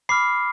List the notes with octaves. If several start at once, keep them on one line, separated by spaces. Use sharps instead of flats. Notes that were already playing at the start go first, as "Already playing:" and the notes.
B5 D6 F6 C7